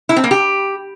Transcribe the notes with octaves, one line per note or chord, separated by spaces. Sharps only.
E4
C4
A#3
G4